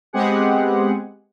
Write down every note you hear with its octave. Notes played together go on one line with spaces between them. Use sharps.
G#3 B3 C4 G4 G#4 F#5